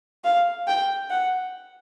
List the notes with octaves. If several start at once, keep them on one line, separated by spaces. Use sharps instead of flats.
F5
G5
F#5